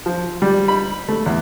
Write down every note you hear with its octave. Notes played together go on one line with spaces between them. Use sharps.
F3
G3
B5
A3
E2